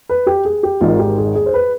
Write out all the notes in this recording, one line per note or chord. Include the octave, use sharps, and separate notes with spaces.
B4
G4
G#4
G4
G#1 G#2 D#3 F4
G4
G#4
G#4
C5
B4